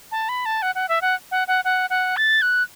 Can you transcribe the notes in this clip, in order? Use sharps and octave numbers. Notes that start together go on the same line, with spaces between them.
A5
B5
A5
F#5
F#5
E5
F#5
F#5
F#5
F#5
F#5
A6
F#6